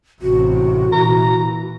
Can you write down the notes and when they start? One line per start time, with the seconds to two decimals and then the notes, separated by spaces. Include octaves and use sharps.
0.22 A1 C3 F#4
0.93 A#2 E3 A#5